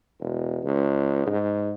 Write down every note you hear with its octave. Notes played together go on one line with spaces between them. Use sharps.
E1
C#2
G#2